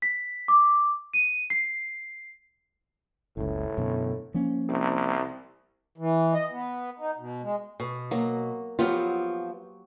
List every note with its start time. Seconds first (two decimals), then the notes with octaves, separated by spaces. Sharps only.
0.02 B6
0.48 D6
1.14 D#7
1.50 C7
3.37 F#1 C#2 A2
3.77 F#2 B2 D3
4.34 F3 A#3 C#4
4.69 C2
5.98 E3
6.34 D#5
6.51 B3
6.99 D#4
7.18 B2
7.42 G#3
7.80 B2
8.11 F#3 A#3
8.79 F3 F#3 B3 F4 G4